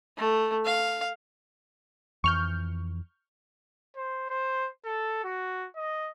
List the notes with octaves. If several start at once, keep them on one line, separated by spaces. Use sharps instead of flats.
A3
F5
F2 E3 C#6 F6 G6
C5
C5
A4
F#4
D#5